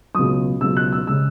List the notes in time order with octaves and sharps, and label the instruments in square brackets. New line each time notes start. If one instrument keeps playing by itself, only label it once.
[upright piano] C#2 B2 F#3 D#6
C#2 B2 F#3 E6
F#6
E6
C#3 G#3 E6